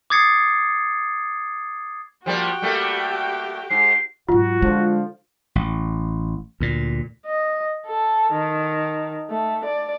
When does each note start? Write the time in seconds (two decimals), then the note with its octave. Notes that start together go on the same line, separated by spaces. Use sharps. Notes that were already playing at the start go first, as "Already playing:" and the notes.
0.10 D6 D#6 G#6 A6 C7 C#7
2.26 F3 G3 A#3 F#4 G4 G5
2.62 G3 A3 A#3
3.70 G#2 C7
4.29 G#2 F#3 F4 F#4
4.62 D3 F3 G#3
5.55 A1
6.60 D2 A#2
7.26 D#5
7.86 A4
8.32 D#3
9.30 A3
9.65 D5